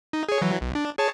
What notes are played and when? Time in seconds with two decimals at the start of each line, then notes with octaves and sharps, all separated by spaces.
0.13 D#4
0.29 G#4 C#5
0.42 E3 F#3
0.61 B1
0.75 D4
0.98 G#4 C#5 A5